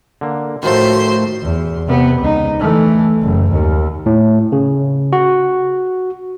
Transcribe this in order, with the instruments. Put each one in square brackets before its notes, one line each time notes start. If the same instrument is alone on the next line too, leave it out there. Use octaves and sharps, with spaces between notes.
[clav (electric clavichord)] D3 A#3
[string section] A2 [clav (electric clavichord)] D#3 F3 A3 [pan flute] F#4 [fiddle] C5
[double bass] E2
C3 B3
C#2 D#4
E3 A3
F#1
D#2
[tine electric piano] A2
C#3
F#4